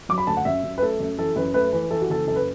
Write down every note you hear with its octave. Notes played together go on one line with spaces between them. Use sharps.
F#3 D6
B5
D2 A5
F#5
F#2 E5
F#2
B4
A3 A4
F#2
E3 A4
F#2 B4
A3 B4
E3 B4
E3 A4
F#4
F#1 A4
F#2 A4
B4